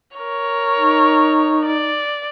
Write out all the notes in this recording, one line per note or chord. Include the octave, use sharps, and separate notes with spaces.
A#4 C#5
D#4
D5